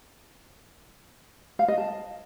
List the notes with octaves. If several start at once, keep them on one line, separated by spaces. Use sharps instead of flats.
F5
D#5
A5